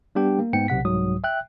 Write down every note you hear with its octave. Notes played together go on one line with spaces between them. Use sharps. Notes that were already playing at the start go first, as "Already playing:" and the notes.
G3 B3 D4 G4 G5
A#3
G#2 B3 G5 C#7
B1 C3 F#5 B6
C2 G#2 F#3 D#6
E5 G5 F#6